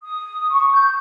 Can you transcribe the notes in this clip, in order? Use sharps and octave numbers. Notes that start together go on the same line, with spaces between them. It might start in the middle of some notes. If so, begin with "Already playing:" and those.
D#6
C#6
G6